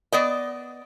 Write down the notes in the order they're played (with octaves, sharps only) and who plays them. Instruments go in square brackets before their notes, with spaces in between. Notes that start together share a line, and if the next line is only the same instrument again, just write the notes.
[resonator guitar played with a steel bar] B3 D5 D#5